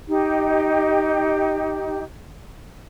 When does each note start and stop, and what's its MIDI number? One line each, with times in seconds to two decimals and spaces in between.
0.08 2.02 63
0.08 2.02 67